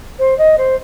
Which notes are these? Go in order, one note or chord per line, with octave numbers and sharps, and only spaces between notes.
C5
D#5
C5